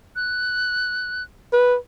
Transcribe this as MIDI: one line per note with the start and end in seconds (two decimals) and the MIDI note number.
0.16 1.23 90
1.52 1.75 71